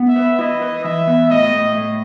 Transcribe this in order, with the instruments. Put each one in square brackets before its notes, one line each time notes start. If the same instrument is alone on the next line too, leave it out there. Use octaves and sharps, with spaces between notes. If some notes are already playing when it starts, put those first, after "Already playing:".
Already playing: [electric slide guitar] B3
[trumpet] E5
[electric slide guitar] B4
[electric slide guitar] E4 [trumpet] D#5
[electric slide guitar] B4
[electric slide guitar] E3 [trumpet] E5
[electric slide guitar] B3
[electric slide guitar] A2 [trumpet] D#5
[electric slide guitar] A2
A2